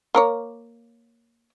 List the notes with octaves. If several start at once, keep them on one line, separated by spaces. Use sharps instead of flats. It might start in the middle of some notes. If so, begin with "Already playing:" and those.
A#3 A#4 C#5